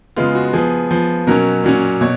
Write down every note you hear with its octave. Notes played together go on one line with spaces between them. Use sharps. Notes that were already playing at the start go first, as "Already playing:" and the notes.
C#3 G#3 B3 F4
F#4
F3 B3 G#4
F3 B3
B2 F#3 C#4 A#4
A#2 F#3 C#4
B2 C#5